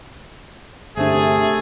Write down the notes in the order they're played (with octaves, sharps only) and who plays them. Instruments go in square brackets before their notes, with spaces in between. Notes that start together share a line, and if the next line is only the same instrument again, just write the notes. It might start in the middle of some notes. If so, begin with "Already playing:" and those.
[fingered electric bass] G1 D4 [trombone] C3 [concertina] A3 [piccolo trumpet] G#4